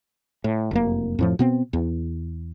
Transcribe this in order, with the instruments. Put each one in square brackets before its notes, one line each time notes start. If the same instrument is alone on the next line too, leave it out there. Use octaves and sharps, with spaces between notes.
[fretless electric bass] A2
F1 F#2 A#3
F2 A2 F3
B2 B3 C4
E2